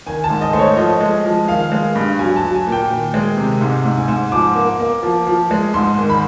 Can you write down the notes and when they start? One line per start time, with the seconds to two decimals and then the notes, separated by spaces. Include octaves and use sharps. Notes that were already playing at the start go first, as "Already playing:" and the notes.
0.06 D#3 G#5
0.24 A5
0.30 G#2
0.41 D#5
0.53 A3 C5
0.59 C#5
0.77 F3 D#5
1.00 G#3
1.25 F3
1.48 D#3 F5
1.72 G#3
1.95 G2
2.19 F#3 G#5
2.36 A5
2.43 F#3
2.54 G#5
2.67 A#2
2.72 G5
2.90 D#3
3.14 G#3
3.37 C3
3.61 G#2
3.85 G#2
3.97 G#5
4.08 G#2
4.32 F3 D6
4.56 A#3
4.80 A#3
5.03 F3
5.27 F3
5.51 G#3
5.74 G#2 C6
5.98 D#3
6.10 B5